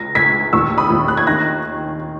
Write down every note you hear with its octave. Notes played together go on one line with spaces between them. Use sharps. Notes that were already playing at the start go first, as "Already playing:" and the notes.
Already playing: C#2 A#6
C#2 G#6 B6
D#2 C#6 E6
B5 D#6
D#2
F#6
G#6
D#3 F#6 A#6